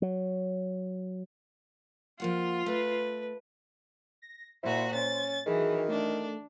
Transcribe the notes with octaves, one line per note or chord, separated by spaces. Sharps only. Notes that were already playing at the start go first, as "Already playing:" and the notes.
F#3
F3 A#3 F4 F#5
A3 B4
A#6
A#2 E4 F#4 C5
C#4 A6
D#3 E3 F#3 G#4
A3 D4